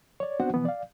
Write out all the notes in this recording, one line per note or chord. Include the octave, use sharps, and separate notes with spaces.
C#5 D5
B3 C4 D4 F#4 C5 F#5
B2 E3 F3 B3
D5 F5